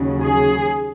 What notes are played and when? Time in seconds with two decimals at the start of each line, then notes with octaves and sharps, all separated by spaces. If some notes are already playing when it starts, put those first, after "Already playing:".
Already playing: D#2 C#3 F#3
0.24 G#4